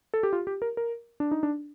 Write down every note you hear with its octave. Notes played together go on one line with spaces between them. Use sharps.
A4
G4
F4
G4
A#4
A#4
D4
D#4
D4